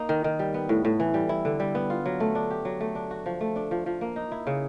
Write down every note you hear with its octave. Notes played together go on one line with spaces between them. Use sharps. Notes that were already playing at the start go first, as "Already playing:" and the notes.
Already playing: A#3 D#4
D#3
D#3
G3
B3
A2
A2
E3
G3
E4
D3
G3
B3
F4
F#3
A3
D4
G4
F#3
A3
D4
F#4
F3
A3
D4
F3
F3
A#3
D#4
E4
C#3